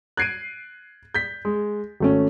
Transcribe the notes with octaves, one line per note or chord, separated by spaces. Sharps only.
F#6 G#6 C7 D7 D#7
G6 B6
G#3
G#1 A3 C#4